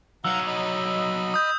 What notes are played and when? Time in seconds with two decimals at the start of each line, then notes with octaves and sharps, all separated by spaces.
0.25 F#3 D#4 F5 F#5 A#5 E6
0.47 D#5 B5
1.34 D#6 G6